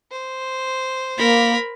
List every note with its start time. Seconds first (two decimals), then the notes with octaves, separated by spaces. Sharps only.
0.11 C5
1.18 A#3 A#4 B5